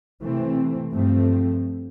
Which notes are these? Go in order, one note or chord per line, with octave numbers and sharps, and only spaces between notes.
C3 E3 A3 C4
G2 F3 A3 C4